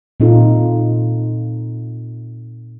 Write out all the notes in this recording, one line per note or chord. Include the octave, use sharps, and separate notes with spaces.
A#2 C4 D#4 F4 A4